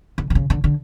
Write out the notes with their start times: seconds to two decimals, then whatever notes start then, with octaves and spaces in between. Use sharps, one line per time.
0.18 D3
0.30 D3
0.35 C#3
0.50 D3
0.64 D3